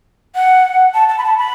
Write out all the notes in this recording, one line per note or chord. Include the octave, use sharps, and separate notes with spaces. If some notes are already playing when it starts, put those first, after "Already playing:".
F#5
A5
A5
B5
A5
B5